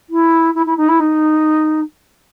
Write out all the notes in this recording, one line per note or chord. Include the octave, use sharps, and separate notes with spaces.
E4
E4
E4
D#4
E4
D#4